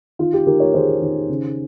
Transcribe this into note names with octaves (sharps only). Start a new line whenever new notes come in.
D#3 F4
G4
D#3 G4 A#4
A#4 C#5
D#3 G#4 C5
D#3
C#3